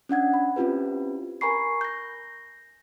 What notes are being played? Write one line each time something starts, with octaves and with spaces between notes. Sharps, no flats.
C#4 D4 F#5 G#6
B5
C4 C#4 E4 F4 G4 B4
A#4 G#5 A#5 B5 C#6 C7
G6 A#6